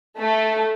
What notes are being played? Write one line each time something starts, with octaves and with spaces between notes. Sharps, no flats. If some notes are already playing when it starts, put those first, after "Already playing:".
A3